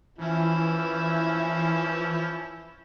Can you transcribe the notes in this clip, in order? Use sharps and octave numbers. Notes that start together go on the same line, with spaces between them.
E3 F3 C#4 E4